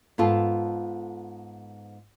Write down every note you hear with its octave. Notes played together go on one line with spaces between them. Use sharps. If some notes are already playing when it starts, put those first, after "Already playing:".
G#2 B3 F4 A4 A5